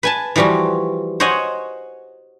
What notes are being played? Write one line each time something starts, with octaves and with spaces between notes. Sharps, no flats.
B4 G#5 A5
E3 F3 G3 F4 F#4
C5 C#5 D#5 F#5 G#5